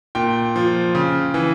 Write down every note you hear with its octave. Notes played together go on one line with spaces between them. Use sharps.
A#2 G5
F3
C#3
E3